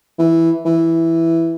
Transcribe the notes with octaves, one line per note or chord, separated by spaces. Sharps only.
E3
E3